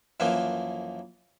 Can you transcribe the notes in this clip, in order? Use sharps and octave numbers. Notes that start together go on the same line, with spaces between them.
F#2 E3 F3 A#3